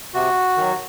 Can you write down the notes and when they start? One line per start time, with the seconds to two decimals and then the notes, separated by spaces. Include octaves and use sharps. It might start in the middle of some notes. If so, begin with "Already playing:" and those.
0.14 C3 F#4
0.57 D#3 F#3